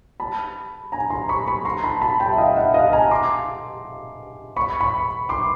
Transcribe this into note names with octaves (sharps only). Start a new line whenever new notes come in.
A5 B5
G#5 A#5
A#5 C6
B5 C#6
B5 C#6
A#5 C6
A5 B5
A5 B5
G5 A5
E5
D#5 F5
E5 F#5
D#5 F5
A5
G#5 A#5
C6 D6
B5 C#6
B5 C#6
C6 D6